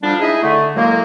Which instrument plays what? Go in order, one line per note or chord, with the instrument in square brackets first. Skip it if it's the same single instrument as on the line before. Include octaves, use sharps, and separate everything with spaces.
[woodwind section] D3 F3 G3 D4
G#3 D#4 E4 G#4 D#5 E5
D3 A3
F#2 A2 F#3 G#3 A#3